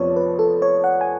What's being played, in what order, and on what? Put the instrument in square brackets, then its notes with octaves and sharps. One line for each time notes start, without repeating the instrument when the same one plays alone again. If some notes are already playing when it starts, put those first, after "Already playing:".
Already playing: [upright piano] F1 F2 F3 B3 [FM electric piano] C#5 D5
[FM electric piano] B4
A4
C#5
F#5
G#5